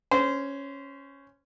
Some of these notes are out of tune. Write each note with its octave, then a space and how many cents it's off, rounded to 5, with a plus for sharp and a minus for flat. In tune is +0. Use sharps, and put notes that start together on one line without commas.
C#4 +0 C5 -20